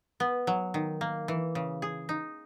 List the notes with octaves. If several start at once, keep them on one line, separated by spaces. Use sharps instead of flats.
B3
F#3
D#3
A#3
E3
C#3
G#4
D#4